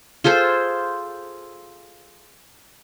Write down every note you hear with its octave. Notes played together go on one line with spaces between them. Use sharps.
F4 G#4 A4 C5